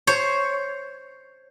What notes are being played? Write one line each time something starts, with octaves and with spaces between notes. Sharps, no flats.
C5 C#5